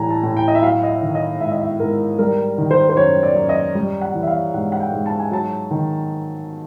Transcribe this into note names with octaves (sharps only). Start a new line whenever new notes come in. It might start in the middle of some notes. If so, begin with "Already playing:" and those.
Already playing: A2 E3 G3 G#5 A#5
A5
A2
G5
D#5
E5
F#3 F5
D#5
E5
D#3
D#5
G#2 E5
D#5
E5
G#2 A#4
G3 A#4
D#3
C5
C5
F#2 C#5
D5
F#2
D#5
G3
F#5
E3
E5
F5
G#2 F#5
F#5
G5
G#2
A5
G#5
F#3 A5
D#3